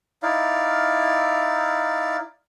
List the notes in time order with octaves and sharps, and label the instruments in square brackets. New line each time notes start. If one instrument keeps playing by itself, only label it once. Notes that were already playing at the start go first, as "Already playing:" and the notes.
[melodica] D#4 E4 D5 F5